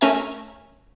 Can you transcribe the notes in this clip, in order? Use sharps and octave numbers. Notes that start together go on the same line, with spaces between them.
A3 C#4 A#4 E5 G#5